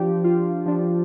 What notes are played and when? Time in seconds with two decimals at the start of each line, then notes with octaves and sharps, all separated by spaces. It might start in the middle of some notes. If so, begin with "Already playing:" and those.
Already playing: F3 D4 G4
0.24 F4
0.66 F3 D4